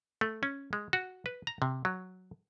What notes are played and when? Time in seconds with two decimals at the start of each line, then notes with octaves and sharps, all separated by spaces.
0.21 A3
0.43 C#4
0.73 G#3
0.93 F#4
1.26 B4
1.47 A#5
1.62 C3
1.85 F#3